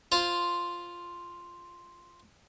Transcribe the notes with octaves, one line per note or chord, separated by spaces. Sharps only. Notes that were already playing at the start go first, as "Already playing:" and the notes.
F4 C5